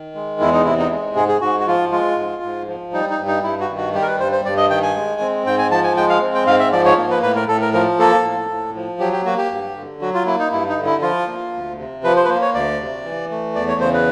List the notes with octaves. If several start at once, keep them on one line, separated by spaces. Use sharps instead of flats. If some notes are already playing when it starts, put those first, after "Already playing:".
Already playing: D#3
G#3
E2 E4
D#4
C3 E4
D#4
G#3
G#2 G#4
G#4
G#2 F#4
F#4
F3 F4
G#3 F4
G#2
G#2
F3
G3 D#4
D#4
G2
D#4
G2 E4
F#4
D#3
F#4
G3 G4
A#4
B4
G2 C5
C5
G2 D5
D#5
D#3 G5
G#5
G#3
C4
G#2 G5
G#5
F3 A5
G#5
G#3 G5
F5
C4
G5
G#2 F5
E5
F3 D5
C#5
A#3
B4
A2 B4
A#4
A2 A4
A#4
F3 A#4
A#3 A4
A2
A2
F3
F#3 G4
G4
A#3 F#4
G4
G2
D3
F#3 F#4
F4
A#3 E4
D#4
G2 E4
D#4
D3
E4
F3 F4
A#3
D2
C3
F3 B4
C5
B4
A#3 C5
C#5
D2 D5
C3
E3
A3
E2 D5
C#5
C#3 C5
B4